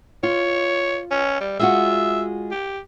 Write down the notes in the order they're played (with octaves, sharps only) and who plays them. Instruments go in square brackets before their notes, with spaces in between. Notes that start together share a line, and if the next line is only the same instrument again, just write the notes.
[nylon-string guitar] F4 [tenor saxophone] C#5
[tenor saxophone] C#4
G3
[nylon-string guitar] G#3 F4 F#4 [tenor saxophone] E5
[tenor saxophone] G4